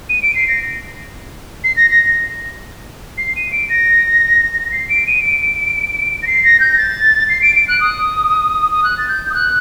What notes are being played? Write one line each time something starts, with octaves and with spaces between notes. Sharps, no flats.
D#7
D7
C7
A#6
C7
A#6
A#6
C7
D#7
D7
A#6
C7
D7
D#7
D7
A#6
C7
A#6
G6
A#6
A6
C7
D7
D7
F#6
D#6
D#6
F#6
A6
G6
D#6
F#6